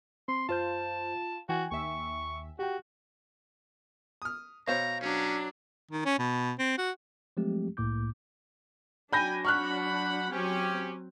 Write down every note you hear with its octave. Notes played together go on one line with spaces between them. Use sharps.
C4 C6
F#2 F4 C5 A5 G6
E3 F#4 G5 G#5
D#2 E5 C#6
F#4 G4 G5
D#6 F6
B2 C5 C#5 F5 A#5
F#3 C#4 D4
D#3
C#4
B2
C4
F#4
F3 F#3 G#3 A3 C4 G4
C2 A2 A#3 D6 G6
F#3 D4 G5 G#5 B5 G6 A#6
F#5 B5 C#6 F6 F#6
F#3 C4 C#4 G4